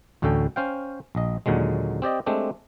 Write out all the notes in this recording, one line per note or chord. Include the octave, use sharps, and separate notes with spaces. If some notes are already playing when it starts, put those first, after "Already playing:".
A1 D2 D3 C#4 A4 G5
C#4 C5 F5 G5
A#1 D#5
D#2 A#2 D3 F#3 G#3
C4 G4 D5 D#5
G#3 A3 C4 D4 G4